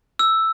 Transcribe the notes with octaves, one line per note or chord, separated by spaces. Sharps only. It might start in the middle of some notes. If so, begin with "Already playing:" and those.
E6